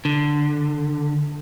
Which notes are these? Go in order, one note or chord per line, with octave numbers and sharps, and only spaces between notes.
D3